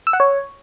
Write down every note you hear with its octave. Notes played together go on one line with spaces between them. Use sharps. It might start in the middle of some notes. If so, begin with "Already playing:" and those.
E6
F#5
C#5